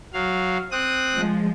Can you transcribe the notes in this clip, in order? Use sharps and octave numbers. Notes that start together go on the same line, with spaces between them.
F#3 F5
C4 D#6 F#6
F3 G#3